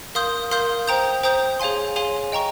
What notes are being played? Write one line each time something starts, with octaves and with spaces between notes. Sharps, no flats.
A#4 F5 C6 D#6 G6
A#4 F5 C6 D#6 G6
C5 G5 A#5 D#6 G6
C5 G5 A#5 D#6 G6
G#4 C#5 F5 G#5 C6
G#4 C#5 F5 G#5 C6
D#5 G5 A#5 C#6